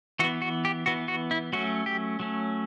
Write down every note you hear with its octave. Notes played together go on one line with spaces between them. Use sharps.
E3 B3 F#4
F#4
G4
E3 B3 F#4
F#4
E4
F#3 A3 C#4 F#4
G4
F#3 A3 C#4